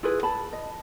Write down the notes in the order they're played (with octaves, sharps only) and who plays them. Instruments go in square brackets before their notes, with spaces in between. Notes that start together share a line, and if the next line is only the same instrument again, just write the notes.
[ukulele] E4 F4 G#4 B4
A5 B5
D#5